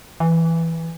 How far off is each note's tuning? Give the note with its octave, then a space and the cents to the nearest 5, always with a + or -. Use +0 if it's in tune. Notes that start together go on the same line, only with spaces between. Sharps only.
E3 +0